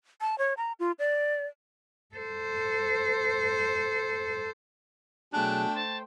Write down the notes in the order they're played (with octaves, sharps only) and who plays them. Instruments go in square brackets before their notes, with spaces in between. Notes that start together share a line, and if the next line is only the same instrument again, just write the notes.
[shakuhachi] A5
C#5
A#5
F4
D5
[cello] A4 C5
[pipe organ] B2 F#3 G#4 [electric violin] A3 G5 [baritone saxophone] D4 [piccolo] F#6
[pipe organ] C5 [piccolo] A5